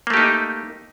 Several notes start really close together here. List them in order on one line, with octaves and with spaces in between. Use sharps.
A#3 A3 G4 D#4